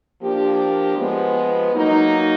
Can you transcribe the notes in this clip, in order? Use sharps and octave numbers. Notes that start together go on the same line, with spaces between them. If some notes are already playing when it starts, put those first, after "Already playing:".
F3 A#3 D4 G4
F3 G#3 B3
F#3 A#3 D#4